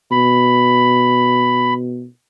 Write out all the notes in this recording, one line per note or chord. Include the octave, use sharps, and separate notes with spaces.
B2 B5